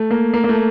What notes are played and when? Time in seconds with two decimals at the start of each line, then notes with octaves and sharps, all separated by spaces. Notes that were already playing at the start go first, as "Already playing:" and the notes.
Already playing: A3
0.11 A#3
0.34 A#3
0.44 A#3
0.49 A3